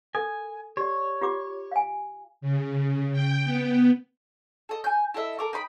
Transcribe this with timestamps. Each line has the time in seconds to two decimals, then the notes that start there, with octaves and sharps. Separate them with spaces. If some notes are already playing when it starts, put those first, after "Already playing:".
0.15 A4 A#4 G#5
0.77 G4 C#5 D5
1.21 F4 G4 D6
1.71 F5 G#5
2.41 C#3
3.13 G5
3.45 B3
4.69 A4 D#5
4.84 G#5 G6
5.14 E4 A4 D#5 E5
5.39 A4 A#4 D6
5.53 D#4 G5 B5